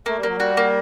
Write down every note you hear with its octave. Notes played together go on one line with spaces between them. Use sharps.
A3 A#3
G3
F#3 A#3
G3 F#4
A#3